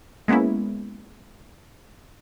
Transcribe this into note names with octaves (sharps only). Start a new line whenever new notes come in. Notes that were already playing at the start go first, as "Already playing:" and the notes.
G#3 A#3 B3 C#4 E4